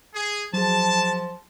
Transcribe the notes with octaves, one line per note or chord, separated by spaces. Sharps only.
G#4
F3 F#3 G#4 A5